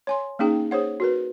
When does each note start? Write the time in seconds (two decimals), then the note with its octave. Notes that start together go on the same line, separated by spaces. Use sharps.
0.07 C#5 G#5 C6
0.39 A#3 C#4 D#4 G#4 G5
0.71 G#4 C5 C#5 F#5
1.00 F#4 A#4 B4